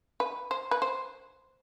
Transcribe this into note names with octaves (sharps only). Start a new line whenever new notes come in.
B4
C5
B4
C5